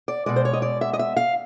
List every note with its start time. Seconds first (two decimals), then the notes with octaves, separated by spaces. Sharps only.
0.08 D5
0.26 B2 G#3 D5
0.36 C5
0.45 C#5
0.53 D#5
0.62 D5
0.81 E5
0.93 D#5
0.99 E5
1.17 F5